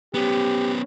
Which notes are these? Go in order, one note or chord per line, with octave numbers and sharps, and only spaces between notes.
B3 C#4 G4